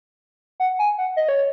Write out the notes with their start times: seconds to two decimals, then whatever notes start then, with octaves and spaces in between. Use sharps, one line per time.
0.60 F#5
0.79 G#5
0.98 F#5
1.17 D#5
1.29 C#5